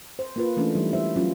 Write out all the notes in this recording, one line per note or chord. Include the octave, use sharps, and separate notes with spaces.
C5
A#3 F4 B4
E3 A3 C#4 D4 E4
E3 F#3 G3 D#4
E4 C5 E5
F#3 C#4 F4